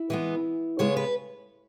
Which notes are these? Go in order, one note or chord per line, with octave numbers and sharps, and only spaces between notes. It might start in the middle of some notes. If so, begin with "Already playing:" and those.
Already playing: E4
E3 G#3 B3
C#3 G#3 B3 C#5
B4